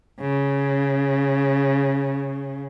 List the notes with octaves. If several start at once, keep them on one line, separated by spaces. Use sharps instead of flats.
C#3